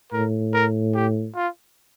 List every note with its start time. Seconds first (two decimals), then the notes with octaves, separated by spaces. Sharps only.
0.12 A2 A#4
0.53 A#4
0.94 G4
1.35 F4